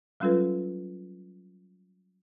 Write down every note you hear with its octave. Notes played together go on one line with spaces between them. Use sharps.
F#3 G3 C#4 F4 A4 B4